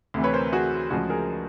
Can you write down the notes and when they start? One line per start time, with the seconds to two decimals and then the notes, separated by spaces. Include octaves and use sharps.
0.14 D2 C3 E3
0.24 B4 C#5
0.33 A#4 C5
0.52 F#4 G#4
0.90 D2 C#3 F3 G#3 F#4 G#4
1.10 G#4 A#4